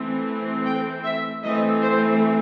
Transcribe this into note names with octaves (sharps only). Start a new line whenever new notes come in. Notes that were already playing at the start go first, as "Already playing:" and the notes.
Already playing: E3 A3 C4
G5
E5
E3 A3 C4 D#5
C5